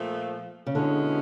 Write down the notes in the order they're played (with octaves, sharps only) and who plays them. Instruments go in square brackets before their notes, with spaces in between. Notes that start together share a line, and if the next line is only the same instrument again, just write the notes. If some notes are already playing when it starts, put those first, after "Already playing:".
Already playing: [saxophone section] A#2 F3 A3
[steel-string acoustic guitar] C#3
[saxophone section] B2 G#3 C#4 E4 G#4 [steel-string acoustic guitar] D3